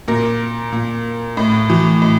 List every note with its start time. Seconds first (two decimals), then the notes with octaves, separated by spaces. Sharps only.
0.08 A#2 A#4
0.72 A#2
1.37 A2
1.70 E3
2.02 A2